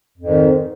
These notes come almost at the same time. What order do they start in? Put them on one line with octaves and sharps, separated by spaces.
F2 G#2 D#3